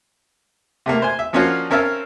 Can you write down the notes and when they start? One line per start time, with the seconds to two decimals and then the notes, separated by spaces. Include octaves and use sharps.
0.86 C3 A3 A#3
1.02 C5 G#5
1.19 E5
1.33 F3 A#3 C#4 D4 F4 F#4
1.70 C4 C#4 A#4 E5 F5 A5